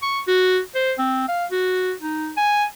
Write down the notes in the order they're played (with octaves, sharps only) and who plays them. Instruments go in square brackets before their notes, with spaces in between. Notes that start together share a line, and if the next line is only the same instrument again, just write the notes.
[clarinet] C#6
F#4
C5
C4
F5
F#4
D#4
G#5